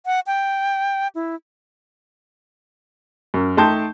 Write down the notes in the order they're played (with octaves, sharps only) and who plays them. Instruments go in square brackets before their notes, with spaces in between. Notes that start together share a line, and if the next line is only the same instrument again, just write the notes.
[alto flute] F#5
G5
E4
[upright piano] F#2
A3 D#4 G5 A5 C6 G6